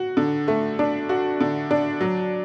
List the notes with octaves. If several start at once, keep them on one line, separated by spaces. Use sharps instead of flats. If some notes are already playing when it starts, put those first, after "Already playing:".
Already playing: F#4
D3
A3
D4
F#4
D3
D4
F#3